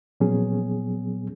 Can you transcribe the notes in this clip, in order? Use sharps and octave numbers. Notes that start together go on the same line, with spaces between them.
A#2 F3 F#3 B3 C#4 G#4